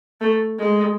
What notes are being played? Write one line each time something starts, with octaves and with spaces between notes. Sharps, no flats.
A3
G#3